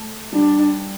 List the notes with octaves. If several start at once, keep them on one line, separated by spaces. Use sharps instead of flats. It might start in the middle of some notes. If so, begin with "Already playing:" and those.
Already playing: A3
G3 D4